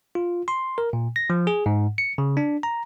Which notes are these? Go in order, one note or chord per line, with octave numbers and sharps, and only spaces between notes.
F4
C6
A#4
A#2
A#6
F3
G#4
G#2
C#7
C#3
D4
A#5